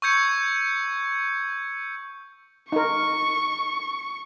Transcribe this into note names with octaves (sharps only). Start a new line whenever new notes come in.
C#6 E6 G6 G#6 C#7
D#4 A#4 C#6